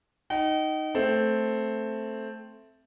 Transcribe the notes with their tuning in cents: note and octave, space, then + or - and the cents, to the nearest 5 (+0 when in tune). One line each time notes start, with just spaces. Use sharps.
D#4 +0 G5 -45
A3 +0 C4 +0